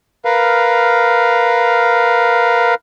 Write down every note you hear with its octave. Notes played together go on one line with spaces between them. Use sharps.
A#4 B4 F5